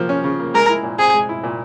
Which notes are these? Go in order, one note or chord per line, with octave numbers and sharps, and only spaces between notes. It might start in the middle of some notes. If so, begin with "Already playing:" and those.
Already playing: F3 A#3
C#4
C#3
A#3
G#3 A#4
E4
A#2
C4 G#4
G#3
E4
A#2